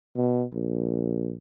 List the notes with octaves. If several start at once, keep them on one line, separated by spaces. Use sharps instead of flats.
B2
A#1